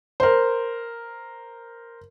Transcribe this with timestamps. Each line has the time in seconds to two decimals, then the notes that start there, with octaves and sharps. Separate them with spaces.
0.20 A#4 C5